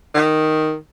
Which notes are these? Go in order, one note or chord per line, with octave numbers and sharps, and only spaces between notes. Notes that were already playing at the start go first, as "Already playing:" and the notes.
D#3